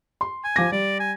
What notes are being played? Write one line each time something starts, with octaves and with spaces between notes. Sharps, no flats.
C6
G#5
F3 D6 A#6
G3 D5
G#5